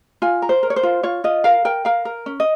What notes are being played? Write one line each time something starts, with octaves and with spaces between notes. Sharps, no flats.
F4 G#5
A#4
C5
A#4
C#5
C5
F4
F4 C#5
F4 D#5
A#4 F5
A#4 G5
A#4 F5
A#4
C#4
D#5